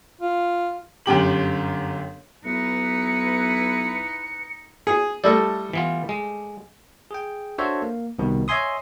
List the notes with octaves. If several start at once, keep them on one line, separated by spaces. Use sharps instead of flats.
F4
G1 F#2 G4 F#7
B1 D#4 E4 B4 C#7
G#4
G3 A3 E4 A4 D#5
E3 B3 F4
G#3
G#4 G5
D4 F#4 A4 C5 C#5 E5
A#3
C2 B2 D#3
C#5 D#5 E5 G#5 C6 D#6